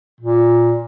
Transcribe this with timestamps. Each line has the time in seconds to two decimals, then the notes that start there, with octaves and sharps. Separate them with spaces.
0.21 A#2